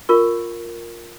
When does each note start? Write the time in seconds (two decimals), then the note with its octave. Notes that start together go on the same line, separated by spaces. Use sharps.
0.09 F4 A#4 C#6